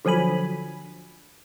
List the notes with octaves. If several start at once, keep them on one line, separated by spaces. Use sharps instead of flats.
D3 F3 F#3 G#5 B5